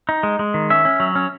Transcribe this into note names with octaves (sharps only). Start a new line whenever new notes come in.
D#4
G#3
G#3
D#3
C#4 E5
C#4
F#3
C#4